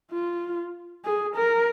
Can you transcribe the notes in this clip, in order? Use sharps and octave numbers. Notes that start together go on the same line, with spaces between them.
F4
G#4
A#4